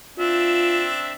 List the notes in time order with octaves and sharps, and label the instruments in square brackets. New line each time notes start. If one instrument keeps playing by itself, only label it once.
[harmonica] C4 D4 E5 [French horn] F4